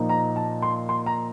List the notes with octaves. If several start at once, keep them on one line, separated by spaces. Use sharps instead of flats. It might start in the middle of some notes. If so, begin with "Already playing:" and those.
Already playing: A#2 F3 A#3 D#4
A#5
A5
C6
C6
A#5